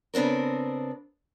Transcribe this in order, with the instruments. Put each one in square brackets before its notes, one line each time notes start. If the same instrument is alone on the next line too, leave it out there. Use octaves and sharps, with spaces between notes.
[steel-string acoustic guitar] C#3 B3 C4 D4 A#4